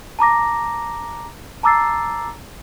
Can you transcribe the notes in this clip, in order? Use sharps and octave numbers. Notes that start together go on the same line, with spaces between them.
A5 A#5 D6 A#6
A5 A#5 D6 E6 A6 C7